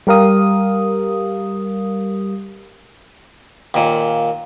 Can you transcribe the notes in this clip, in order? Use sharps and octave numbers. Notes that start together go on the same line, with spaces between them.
G3 G4 A#4 F5 D#6
D#2 A#2